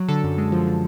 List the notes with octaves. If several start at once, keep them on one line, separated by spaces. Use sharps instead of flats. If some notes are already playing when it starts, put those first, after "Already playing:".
Already playing: F#3
D3 A4
F#2
G#3
F3
D3